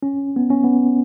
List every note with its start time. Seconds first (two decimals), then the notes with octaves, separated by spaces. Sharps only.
0.03 C#4
0.36 B3
0.50 C#4
0.64 B3